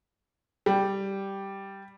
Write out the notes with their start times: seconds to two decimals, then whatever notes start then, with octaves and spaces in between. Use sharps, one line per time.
0.66 G3